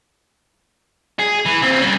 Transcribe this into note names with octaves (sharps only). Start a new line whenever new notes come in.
G#4
E3
A#2 C4
G3 C#4